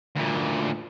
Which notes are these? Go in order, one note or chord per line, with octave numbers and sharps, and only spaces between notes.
D2 A#2